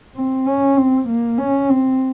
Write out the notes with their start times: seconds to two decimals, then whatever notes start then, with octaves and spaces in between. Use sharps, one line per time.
0.15 C4
0.46 C#4
0.77 C4
1.08 A#3
1.39 C#4
1.70 C4